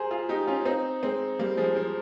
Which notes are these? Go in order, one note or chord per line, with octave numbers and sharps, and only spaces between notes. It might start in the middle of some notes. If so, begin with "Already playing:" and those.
Already playing: G4 G#4 A#4 C5
F4 G#4
D#4 G4
C#4 F4
C4 D#4
G#3 C4
G3 A#3
F3 G#3
F3